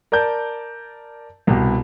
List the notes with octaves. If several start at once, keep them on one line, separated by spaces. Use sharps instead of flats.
A#4 D5 A5 G6
C2 B2 G4